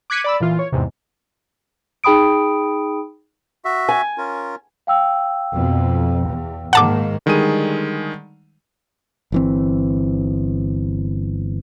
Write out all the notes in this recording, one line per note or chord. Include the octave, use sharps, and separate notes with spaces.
D6 F#6 G#6 B6 C#7 D#7
D5 B5 E6
A#2 E3 F4
C#5
E2 G#2 C3
D#4 G#4 G5 B5 D#6 D7
F#4 E5
G#5
C#4 F4 A#4
F5 G5 E6
F2 B2
E2
G#2 D#3 A#3 F#5 A5 D6
D3 D#3 G3 G#3 G#4 D#7
G1 E3 C4